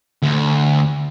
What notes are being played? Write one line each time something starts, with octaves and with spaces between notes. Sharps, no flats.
D2